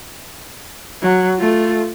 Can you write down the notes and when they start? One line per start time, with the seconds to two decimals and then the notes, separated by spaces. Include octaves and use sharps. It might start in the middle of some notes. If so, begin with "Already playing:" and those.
1.01 F#3
1.39 A3 F4